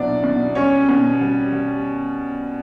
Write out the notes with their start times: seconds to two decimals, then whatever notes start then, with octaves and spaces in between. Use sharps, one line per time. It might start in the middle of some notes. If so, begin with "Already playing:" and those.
Already playing: B2 F#3 D4 E4 D5
0.24 B2
0.55 G3 C#4 C#5
0.89 B2
1.21 G3
1.53 G3